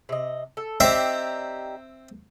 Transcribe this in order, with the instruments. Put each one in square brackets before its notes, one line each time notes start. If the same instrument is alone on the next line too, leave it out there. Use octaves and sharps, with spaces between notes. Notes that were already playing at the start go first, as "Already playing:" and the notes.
[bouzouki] C3 D#5
A4
[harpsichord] C4 C5 E5 [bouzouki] D#4 G4 D5